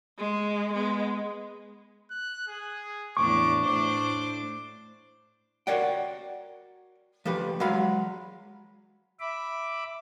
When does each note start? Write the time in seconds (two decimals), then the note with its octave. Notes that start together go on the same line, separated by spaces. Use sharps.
0.18 G#3
0.73 G#3 B3
2.11 F#6
2.48 G#4
3.17 E2 A2 D4 C#6 D6
3.65 A2 D4 C5 D6
5.67 F#4 A#4 C#5 D5 F#5 G5
7.25 F3 A3 G4 B4
7.60 F#3 G#3 F5 B5
9.20 E5 B5 D6